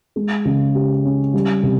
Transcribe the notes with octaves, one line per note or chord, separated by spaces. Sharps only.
G#3
C#3
G4
C#4
G3
C3